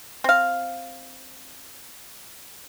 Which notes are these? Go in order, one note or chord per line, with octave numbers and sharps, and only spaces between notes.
C4 F5